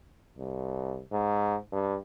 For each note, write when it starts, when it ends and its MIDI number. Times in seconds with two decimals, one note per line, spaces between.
0.38 1.02 36
1.12 1.55 44
1.72 1.96 43